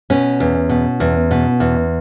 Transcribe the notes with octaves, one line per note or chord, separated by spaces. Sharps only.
B2 C#4
E2
B2
E2
B2
E2